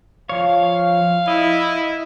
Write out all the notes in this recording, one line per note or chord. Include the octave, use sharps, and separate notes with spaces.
F3 C#5 F5
E4 D#5